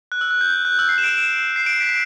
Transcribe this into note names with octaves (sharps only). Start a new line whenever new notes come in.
F#6
E6
F#6
G6
F#6
F#6
E6
C7
E7
D7
E7
C7
D7
B6